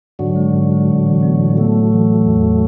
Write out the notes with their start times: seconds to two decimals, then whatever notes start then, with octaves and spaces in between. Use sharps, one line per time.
0.19 G#2 D3 F#3
0.36 G#3
0.53 G#2
0.71 G#3
0.88 A2
1.06 E3
1.23 B3
1.39 A2
1.57 A2 F#3 A3
1.74 A2
1.92 E3
2.09 A2
2.26 E2